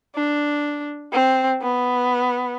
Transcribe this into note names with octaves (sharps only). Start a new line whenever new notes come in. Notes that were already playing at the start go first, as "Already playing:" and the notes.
D4
C4
B3